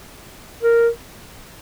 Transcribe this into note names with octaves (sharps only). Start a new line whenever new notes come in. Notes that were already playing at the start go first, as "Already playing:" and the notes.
A#4